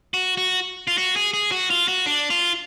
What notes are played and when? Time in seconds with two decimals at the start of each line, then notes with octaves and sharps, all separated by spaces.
0.14 F#4
0.38 F#4
0.87 F4
0.98 F#4
1.16 G#4
1.34 G#4
1.52 F#4
1.70 F4
1.88 F#4
2.06 D4
2.30 F4